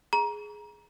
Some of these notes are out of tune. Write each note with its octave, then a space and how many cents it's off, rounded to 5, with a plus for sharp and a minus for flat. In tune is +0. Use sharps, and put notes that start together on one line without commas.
G#4 +10 A#5 +25